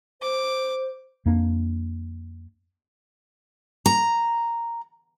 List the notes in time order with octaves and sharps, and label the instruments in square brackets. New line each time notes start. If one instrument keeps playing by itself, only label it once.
[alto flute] C5 [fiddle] D6
[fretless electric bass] F2 A#3 D4
[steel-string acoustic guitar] A#5